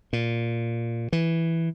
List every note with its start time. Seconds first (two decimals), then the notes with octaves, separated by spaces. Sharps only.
0.13 A#2
1.13 E3